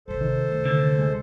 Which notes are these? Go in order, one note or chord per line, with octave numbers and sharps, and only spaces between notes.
G#1 C3 A4 C5
D#3
D2 C3
D3
G#3